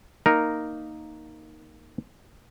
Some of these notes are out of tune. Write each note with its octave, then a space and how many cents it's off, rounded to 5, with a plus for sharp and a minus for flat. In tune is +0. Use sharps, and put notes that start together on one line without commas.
A#3 -5 D#4 +0 A#4 +0